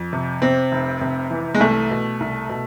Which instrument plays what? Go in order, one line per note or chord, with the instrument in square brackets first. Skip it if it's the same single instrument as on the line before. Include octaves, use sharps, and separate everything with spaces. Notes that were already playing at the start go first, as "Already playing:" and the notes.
Already playing: [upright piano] F2
C3
C3 C4
F1
C3
E3
G#3
C2 A3
B2
C2
B2